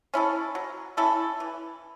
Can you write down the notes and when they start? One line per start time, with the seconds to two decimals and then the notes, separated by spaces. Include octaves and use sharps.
0.14 C#4 E4 A4
0.55 F#3
0.97 C#4 E4 A4
1.40 E3